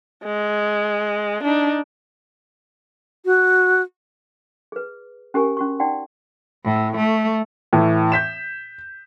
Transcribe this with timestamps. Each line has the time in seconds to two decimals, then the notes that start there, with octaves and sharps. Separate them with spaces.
0.24 G#3
1.43 D4 D#4
3.25 F#4
4.72 G#4 B4
5.34 C#4 G4 A#4 G#5 C#6
5.57 C#4 F#4 C#6
5.79 D#4 D5 F#5 G5 C6
6.65 A2
6.97 A3
7.73 A2 E3
8.12 G6 B6 E7